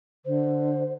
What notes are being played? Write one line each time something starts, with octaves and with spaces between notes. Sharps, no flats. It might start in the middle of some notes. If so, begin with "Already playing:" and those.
D3 C5